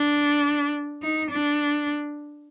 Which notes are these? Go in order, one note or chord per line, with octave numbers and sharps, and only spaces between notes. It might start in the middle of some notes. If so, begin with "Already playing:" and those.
Already playing: D4
D#4
D4